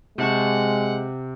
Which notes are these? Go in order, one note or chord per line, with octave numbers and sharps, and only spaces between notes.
C3 G#3 F#5 A5 C#6